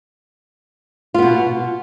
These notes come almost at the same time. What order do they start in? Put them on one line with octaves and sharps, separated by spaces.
F4 B3 B2